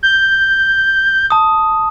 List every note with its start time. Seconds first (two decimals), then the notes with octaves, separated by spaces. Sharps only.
0.03 G6
1.30 A5 D#6